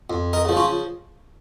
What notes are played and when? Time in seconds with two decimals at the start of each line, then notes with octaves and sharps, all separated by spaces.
0.10 F2
0.33 A#4 D#5
0.45 C#3 F3
0.56 C#4 F4